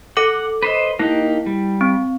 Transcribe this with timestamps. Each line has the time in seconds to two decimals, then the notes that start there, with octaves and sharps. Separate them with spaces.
0.17 A4 F#5 D6
0.63 B4 C5 D#5
0.99 A#3 D#4 E4 G4
1.46 G3
1.81 C4